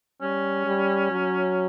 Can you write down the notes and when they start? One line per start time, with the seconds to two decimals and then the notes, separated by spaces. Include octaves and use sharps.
0.22 G3 C#4
0.66 G3
1.11 F#3